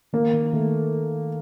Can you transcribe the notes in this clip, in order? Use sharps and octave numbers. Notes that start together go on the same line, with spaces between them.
D#3 A#3
D#3
D#3 A3